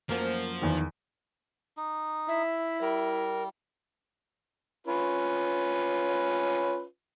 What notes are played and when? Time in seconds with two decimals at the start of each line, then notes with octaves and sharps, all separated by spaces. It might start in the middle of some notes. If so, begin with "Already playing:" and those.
0.09 F#2 F3 A#3 C5
0.62 E2 D#3
1.77 D#4
2.29 E4 E5
2.81 G3 A#4
4.87 C#4 F4 B4